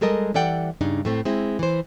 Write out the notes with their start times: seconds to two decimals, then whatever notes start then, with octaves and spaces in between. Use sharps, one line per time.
0.01 G3 G#3 A4 A#4 D#5
0.34 E3 G3 A4 D5 F#5 G5
0.81 G2 C#3 D4 D#4
1.05 A2 A3 C4
1.25 G#3 C4 E4
1.59 E3 C5